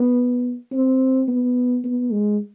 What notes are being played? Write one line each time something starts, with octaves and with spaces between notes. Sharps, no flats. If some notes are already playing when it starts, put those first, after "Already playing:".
Already playing: B3
C4
B3
B3
G#3